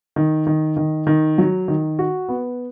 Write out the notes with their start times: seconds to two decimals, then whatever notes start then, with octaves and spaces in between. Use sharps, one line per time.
0.16 D#3
0.47 D#3
0.77 D#3
1.07 D#3
1.38 F#3
1.68 D#3
1.99 F#4
2.29 B3